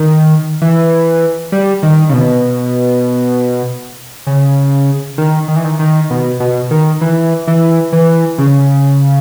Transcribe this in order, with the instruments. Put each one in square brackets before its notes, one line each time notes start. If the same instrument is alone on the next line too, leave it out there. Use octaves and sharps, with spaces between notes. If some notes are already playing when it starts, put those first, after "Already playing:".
Already playing: [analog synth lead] D#3
E3
G3
D#3
C#3
B2
C#3
D#3
D#3
E3
D#3
D#3
B2
B2
D#3
E3
E3
E3
C#3